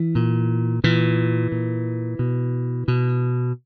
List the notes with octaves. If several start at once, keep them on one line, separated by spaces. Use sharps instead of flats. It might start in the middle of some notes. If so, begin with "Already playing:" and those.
Already playing: E3
A#2
A#2 E3
A#2
B2
B2